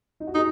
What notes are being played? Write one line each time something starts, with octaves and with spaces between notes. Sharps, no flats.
D#4
F#4
D#4 G#4